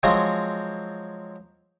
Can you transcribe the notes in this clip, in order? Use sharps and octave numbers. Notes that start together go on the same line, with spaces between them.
F3 F#3 G#3 C4